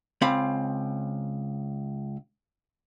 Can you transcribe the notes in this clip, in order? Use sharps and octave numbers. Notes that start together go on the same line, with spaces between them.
C#2 C4 F5 B5